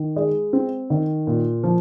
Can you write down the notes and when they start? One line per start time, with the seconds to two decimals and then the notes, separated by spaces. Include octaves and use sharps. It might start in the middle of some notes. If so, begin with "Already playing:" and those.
Already playing: D#3
0.16 G#3
0.53 C4
0.90 D#3
1.27 A#2
1.64 F3